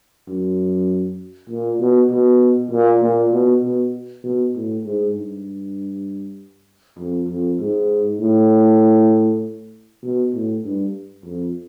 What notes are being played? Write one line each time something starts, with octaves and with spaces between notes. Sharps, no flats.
F#2
A#2
B2
B2
A#2
A#2
B2
B2
B2
A2
G#2
G2
F2
F2
G#2
A2
B2
A2
G2
F2